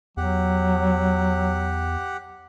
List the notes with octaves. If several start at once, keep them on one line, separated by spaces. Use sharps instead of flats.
E2 F#3 G4 F#5